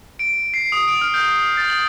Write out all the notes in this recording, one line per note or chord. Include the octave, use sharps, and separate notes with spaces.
D7
C7
D#6
D7
F6
G6
A6
F#7